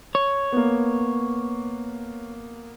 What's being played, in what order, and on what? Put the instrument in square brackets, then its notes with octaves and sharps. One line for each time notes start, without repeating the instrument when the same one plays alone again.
[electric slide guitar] C#5
[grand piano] A#3 B3